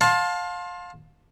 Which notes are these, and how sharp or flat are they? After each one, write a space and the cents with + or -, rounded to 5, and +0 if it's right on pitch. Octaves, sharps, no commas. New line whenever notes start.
F5 +30 A5 +0 C6 +20